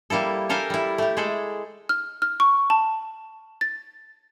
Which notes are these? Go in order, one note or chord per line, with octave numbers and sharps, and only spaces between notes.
G3 A#3 E4 A4
G4 A4 A#4 F5 G5 G#5
G3 E4
A3 E4 G4
G#3 G#4 A4 D5
F6
F6
C#6
A5
A6